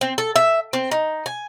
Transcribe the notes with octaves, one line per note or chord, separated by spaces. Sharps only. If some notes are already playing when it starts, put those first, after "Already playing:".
C4
A4
E5
C4
D#4
G#5